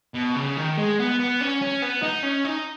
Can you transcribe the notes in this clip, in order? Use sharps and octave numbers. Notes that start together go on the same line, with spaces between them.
B2
C#3
D#3
G#3
B3
B3
C#4
C#4
B3
D#4
C#4
D#4